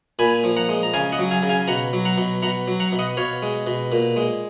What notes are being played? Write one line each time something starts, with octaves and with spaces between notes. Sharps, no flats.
A#2 G#5 B5
F3
F#5 A#5
G#3
A#5
C#3 F5 G#5
D#5 F#5
F#3
F5 G#5
C#3
F5 G#5
B2 F#5 A#5
F#3
F#5 A#5
B2
B2 F#5 A#5
F#3
F#5 A#5
B2
D#5 F#5
B2 C#5 F5
G#3
B2
A#2
G#3